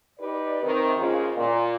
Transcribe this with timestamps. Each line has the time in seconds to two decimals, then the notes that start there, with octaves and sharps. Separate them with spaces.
0.20 D#4 G4 B4 D5
0.63 C3 D#3
0.98 D#2 G#2 C#3 G#3 F4
1.36 A#2